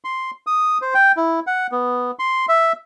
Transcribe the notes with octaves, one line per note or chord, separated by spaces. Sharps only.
C6
D#6
C5
G5
E4
F#5
B3
C6
E5